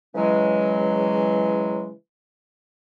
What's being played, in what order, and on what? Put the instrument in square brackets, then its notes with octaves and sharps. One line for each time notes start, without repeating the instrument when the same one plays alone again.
[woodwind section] C#3 E3 F#3 G#3